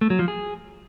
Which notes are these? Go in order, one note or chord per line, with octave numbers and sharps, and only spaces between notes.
A3
F#3
F3
G#4